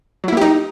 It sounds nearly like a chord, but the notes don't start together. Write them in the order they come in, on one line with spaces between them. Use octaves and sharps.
F#3 E4 A#3 G4 D#4